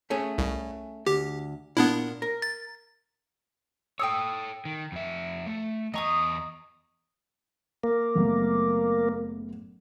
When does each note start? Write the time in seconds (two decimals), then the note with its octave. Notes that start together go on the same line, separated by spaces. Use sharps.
0.10 A3 C#4 G#4
0.38 C2
1.07 D2 G4
1.77 A#2 B3 D4 E4
2.22 A#4
2.42 A6
3.99 A4 C#5 G5 D#6 E6
4.65 D#3
4.92 F2 E5
5.47 A3
5.94 E2 D#5 A#5 C#6 D#6
7.84 A#3
8.15 F#1 A3 B3